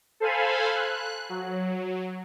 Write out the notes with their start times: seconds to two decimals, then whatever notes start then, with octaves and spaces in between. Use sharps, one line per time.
0.20 A4 C5 F5 G#5 B5
0.74 F#6
1.29 F#3